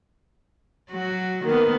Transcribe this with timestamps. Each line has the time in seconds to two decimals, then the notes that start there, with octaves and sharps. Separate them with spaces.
0.91 F#3 F#4
1.45 D#3 A#3 B3 A#4